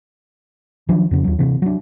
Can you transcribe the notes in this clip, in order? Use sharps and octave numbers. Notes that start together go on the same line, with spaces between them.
D#3 F3 F#3 D4
F2 C#3
D#2 F#3
C3 E3
F#3 D4